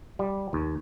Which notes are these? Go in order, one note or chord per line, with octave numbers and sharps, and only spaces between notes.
G3
D#2